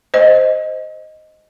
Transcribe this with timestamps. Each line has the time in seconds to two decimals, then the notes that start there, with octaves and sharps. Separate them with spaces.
0.14 C5 D#5